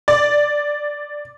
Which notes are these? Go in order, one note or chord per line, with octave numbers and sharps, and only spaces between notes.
D5